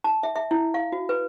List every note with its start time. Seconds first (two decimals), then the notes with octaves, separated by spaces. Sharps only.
0.04 A5
0.23 E5
0.36 E5
0.51 E4
0.74 F5
0.92 F#4
1.09 B4